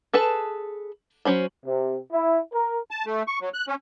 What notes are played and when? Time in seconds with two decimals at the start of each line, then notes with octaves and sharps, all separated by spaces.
0.13 G#4 A4 B4 A5
1.25 F#3 C#4 C5 B5
1.64 C3
2.12 E4
2.53 A#4
2.91 A5
3.06 A3
3.27 C#6
3.41 F#3
3.54 F#6
3.68 C#4